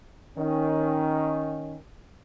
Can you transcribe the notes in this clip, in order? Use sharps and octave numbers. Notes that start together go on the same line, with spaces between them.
D#3 C#4